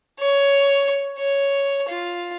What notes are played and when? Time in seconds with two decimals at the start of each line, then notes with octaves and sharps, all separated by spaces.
0.20 C#5
1.19 C#5
1.89 F4